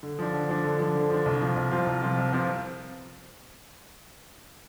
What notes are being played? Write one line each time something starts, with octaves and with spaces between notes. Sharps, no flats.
D3
F3 D4
D3
F3 D4
D3
F3 D4
D3
F3 D4
C2
C3 F3 C4 F4
C2
C3 F3 C4 F4
C2
C3 F3 C4 F4
C2
C3 F3 C4 F4